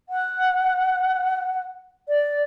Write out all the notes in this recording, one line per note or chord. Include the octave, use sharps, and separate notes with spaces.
F#5
D5